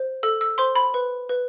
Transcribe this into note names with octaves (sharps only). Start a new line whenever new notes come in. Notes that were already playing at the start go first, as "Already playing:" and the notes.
Already playing: C5
A4 E6
E6
C5 C6
B5
B4
B4